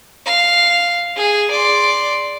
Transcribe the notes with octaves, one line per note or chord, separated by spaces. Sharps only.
F5
G#4
D5 C6